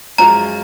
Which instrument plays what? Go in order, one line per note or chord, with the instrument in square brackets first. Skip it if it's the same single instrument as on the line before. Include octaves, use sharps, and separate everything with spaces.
[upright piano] F#2 F3 G#3 C#4 F4 [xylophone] A#5